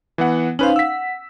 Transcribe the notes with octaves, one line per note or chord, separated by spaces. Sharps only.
E3 B3 F#5
C#4 D#4 B4 C5 F5
F#5 E6 B6